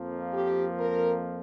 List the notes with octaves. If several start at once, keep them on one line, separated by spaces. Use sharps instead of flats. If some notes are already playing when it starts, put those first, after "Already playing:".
Already playing: F2 F3 A#3
G4
A#4